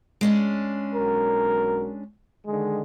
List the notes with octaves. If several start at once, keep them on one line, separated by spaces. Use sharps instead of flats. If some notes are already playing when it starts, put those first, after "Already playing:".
G#3 C#4 D4
B1 F#4 A#4
D3 D#3 G#3